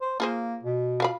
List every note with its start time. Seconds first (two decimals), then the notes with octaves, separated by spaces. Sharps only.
0.01 C5
0.20 A#3 F4 G#4 C5
0.63 B2
1.00 F4 F5 B5